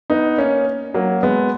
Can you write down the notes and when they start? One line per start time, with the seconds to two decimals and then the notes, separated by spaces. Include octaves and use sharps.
0.10 B3 D#4
0.38 A#3 C#4
0.94 F#3 A#3
1.23 G#3 B3